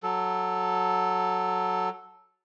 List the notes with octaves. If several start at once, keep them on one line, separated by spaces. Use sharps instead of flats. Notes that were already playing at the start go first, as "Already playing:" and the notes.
F#3 A4